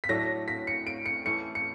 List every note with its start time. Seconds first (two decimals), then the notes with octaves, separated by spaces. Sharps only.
0.04 B6
0.09 A2 F#3 A3 D4 A#6
0.48 B6
0.67 C#7
0.87 D7
1.06 C#7
1.25 E3 A3 C#4 C#7
1.55 C#7